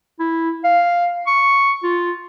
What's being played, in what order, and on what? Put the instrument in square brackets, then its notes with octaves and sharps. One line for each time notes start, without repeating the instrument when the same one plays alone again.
[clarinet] E4
F5
C#6
F4